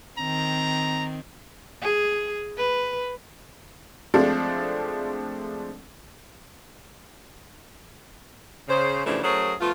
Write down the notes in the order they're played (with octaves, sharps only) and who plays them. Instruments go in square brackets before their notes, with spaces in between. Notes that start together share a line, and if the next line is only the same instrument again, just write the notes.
[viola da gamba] D#3 C4 [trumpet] A#5
[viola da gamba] G#4
B4
[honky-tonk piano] F3 G#3 A3 C4 D4
[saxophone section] C#3 C5
C#3 E3 F3 G3 A3 D4
F#3 A3 C#4 G#4 A#4 C5
F3 A3 B3 F4